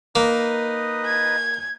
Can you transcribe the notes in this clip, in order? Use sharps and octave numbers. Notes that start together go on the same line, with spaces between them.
A#3 D#4 B4 D#5
G#6